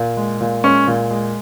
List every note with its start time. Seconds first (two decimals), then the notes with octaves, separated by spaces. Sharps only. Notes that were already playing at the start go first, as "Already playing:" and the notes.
Already playing: A#2
0.17 G#3
0.41 A#2
0.64 G#3 C#4
0.87 A#2
1.11 G#3